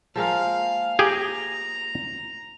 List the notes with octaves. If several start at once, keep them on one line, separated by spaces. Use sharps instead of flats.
F3 G#3 A#3 F5
G4 G#4 A#5